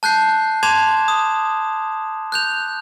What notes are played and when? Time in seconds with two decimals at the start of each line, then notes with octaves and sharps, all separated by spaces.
0.03 A5 F#6 G6 C7
0.63 A5 C6 D6 G#6 E7 F7
1.08 D#6
2.32 F#6 G6 F7